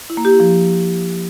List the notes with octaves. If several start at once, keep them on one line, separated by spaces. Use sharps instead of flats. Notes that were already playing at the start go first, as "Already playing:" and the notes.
E4
A#3
G4
E4
F3